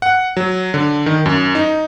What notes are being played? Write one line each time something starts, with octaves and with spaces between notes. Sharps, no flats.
F#5
F#3
D3
D#3
F#2
D#4